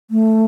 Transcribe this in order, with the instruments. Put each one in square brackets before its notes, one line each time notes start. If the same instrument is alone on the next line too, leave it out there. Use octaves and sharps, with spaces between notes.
[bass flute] A3